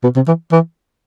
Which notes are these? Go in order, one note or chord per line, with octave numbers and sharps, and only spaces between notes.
B2
C3
E3
E3